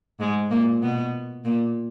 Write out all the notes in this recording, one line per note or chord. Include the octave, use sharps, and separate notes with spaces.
G#2 G#3
A#2 A#3
B2 B3
A#2 A#3